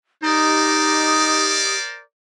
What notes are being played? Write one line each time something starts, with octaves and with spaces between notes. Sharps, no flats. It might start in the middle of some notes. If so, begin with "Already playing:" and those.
D#4 G4 A#4 C5 D5 D#5 D#6